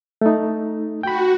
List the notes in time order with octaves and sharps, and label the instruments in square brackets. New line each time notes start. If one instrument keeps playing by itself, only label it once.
[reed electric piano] A3 D#4
[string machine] F#4 [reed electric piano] G5 B5